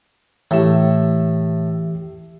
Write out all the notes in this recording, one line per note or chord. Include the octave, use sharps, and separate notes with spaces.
A2 E3 G4